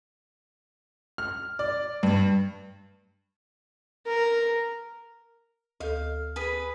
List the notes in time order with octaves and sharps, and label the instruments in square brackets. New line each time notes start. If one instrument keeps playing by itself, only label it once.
[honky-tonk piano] F6
D5
G2
[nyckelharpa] A#4
[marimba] D2 A4 [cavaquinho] F5
[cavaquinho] G#4 B4